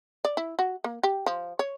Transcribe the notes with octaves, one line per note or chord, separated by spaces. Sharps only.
D5
E4
F#4
A#3
G4
F3
C#5